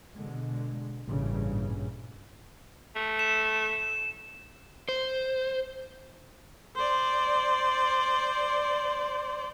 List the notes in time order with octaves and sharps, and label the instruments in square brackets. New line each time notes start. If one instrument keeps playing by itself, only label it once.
[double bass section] B2 D3 G#3
A1 G2 A#2 C#3 E3
[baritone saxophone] A3
[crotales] E7
[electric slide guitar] C5
[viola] C5 D5